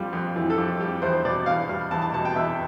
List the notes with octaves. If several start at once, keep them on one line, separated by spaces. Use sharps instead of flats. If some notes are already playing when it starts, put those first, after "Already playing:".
Already playing: F2 G3 F4
F2
E3
A4
F2 G4
G3 G4
E2 C5
B2 D5
E2 F5
G3
E2 A5
A5
B2 A5
G5
E2 E5